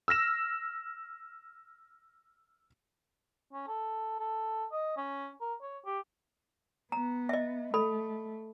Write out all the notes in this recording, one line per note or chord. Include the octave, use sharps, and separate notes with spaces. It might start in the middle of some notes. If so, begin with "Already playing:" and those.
E6 F6 A#6 E7
C#4
A4
A4
D#5
C#4
A#4
C#5
G4
B3 A#5
D#5 E5
A3 A4 B5